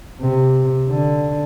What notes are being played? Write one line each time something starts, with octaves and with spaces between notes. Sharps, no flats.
C3
D3